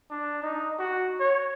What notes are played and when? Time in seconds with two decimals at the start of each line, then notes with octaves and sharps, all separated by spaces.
0.11 D4
0.42 D#4
0.79 F#4
1.20 C#5